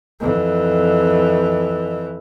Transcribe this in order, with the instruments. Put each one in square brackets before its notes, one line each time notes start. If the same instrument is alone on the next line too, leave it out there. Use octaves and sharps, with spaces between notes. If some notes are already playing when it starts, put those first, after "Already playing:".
[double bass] F2 E3